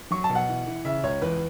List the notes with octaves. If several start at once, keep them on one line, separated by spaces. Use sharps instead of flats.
F#3 C#6
A5
B2
F#5
E3
E3
C#3 E5
C#2 C#5
E2 B4